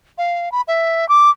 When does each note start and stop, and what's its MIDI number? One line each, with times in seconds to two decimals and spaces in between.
0.18 0.52 77
0.52 0.62 83
0.68 1.08 76
1.09 1.30 86